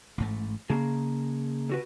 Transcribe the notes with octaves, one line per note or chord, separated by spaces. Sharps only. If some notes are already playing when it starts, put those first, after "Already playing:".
A1 G#2 A3
C#3 A#3 G#4
D3 F#4 B4